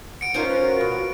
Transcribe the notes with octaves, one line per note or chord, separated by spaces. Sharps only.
F#5 C#7 D7
C#4 D#4 F4 A#4 C5 D7
B4
F#4
B2